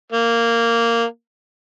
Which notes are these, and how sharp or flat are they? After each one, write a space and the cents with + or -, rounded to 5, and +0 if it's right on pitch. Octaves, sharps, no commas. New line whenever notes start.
A#3 -10